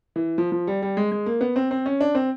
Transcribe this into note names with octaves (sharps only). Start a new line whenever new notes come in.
E3
F3
F3
G3
G3
G#3
G#3
A#3
B3
C4
C4
C#4
D4
C4